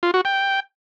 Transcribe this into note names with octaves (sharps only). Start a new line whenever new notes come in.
F4
F#4
G5